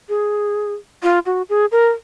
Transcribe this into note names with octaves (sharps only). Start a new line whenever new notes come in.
G#4
F4
F#4
G#4
A#4